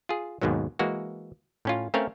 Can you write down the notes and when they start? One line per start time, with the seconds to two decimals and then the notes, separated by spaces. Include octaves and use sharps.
0.09 F4 G#4
0.42 D#2 G#2 B2 D#3 F#3
0.79 E3 G#3 A#3 F#4
1.65 A2 C#4 F4
1.94 A3 C4 C#4 A#4 C#5 F5